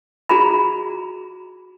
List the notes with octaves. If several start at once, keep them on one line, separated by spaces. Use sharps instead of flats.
F#4 G#4 A#5 B5